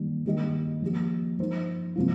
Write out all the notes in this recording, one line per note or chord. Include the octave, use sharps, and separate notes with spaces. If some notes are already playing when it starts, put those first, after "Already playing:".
Already playing: D#3 G3 A#3
D#3 G3 A#3 G4 D#5
F3 A#3 G4
F3 D#4 C5
C3 F3 A#3 F4